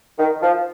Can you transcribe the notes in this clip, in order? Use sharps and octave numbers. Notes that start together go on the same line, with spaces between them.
D#3
F3